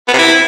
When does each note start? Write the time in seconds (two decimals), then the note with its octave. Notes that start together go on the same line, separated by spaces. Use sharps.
0.08 B3
0.13 C3
0.19 E4